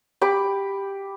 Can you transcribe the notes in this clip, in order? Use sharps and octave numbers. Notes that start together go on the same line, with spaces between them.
G4 B5 D6